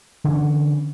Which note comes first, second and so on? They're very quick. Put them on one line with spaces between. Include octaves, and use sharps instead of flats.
D3 E3 C#4